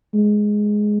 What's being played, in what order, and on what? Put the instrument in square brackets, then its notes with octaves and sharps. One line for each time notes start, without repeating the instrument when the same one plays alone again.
[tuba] G#3